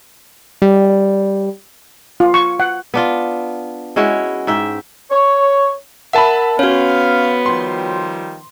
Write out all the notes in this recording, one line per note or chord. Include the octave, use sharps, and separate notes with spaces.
G3
F4
C#6
F#5
B3 D4 F4
G#3 C#4 E4 F#4
G#2 E5 G5
C#5
A#4 E5 F#5 A5 B5
B3 C#4 F#4 C#5 F5
D#3 F3 G3 C6